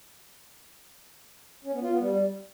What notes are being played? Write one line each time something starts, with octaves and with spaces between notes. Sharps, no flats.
C#4
B3
F4
B3
G3